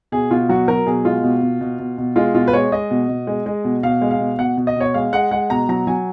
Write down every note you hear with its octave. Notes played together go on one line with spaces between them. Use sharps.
B2 G#4
B2 F4
F#3 F#4
F#3 A#4
B2 G#4
G#3 F4
B2
B2
B2
B2
B2
G#3 F4
B2 F4
B4
G#3 C#5
G#3 D#5
B2
B2
G#3
G#3
B2
B2 F5
G#3
F5
B2
B2 F#5
B2
D#5
B2 C#5
G#3 F5
G#3 F#5
G#3 F#5
B2 A#5
F#3 A#5
F#3 G#5